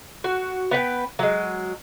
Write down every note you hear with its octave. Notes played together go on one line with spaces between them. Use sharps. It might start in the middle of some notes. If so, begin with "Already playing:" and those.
F#4
B3 B4 F#5 G5
F#3 G#3